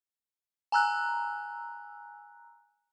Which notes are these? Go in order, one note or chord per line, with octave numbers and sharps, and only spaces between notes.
G#5 A#5 E6 F#6